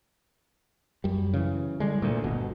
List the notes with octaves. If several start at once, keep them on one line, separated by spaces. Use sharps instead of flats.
F#2 G3
C#3 E3
D3 G3 G#3
D2 A#2
G1 B2